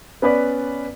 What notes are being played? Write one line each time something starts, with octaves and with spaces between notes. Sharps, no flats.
B3 C#4 B4 D5